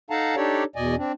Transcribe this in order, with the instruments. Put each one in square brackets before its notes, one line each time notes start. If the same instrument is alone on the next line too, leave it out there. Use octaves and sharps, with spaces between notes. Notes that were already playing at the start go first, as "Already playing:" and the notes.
[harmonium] D#4 A4 F5 F#5 A5 A#5
D4 D#4 G4 A4 C#5 D5
E2 B2 D5 D#5 G#5
C4 D4